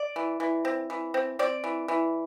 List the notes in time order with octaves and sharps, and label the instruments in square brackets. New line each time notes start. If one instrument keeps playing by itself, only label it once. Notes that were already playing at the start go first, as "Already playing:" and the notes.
Already playing: [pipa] D5
E3
E3
C4
E3
C4
C4 D5
E3
E3